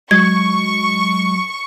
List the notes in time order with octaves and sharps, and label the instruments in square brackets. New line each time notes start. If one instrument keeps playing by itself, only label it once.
[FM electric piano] F#3 [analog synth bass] G#3 [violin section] C#6 [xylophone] G#6